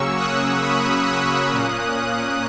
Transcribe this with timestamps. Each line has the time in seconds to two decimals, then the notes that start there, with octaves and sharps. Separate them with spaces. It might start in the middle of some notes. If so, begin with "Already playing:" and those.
Already playing: C#3 F#3 A#3 C#4 C#6 E6
0.16 D#6 F#6
0.62 B5 D#6
1.06 D#6 F#6
1.52 A#2 A#3 C#4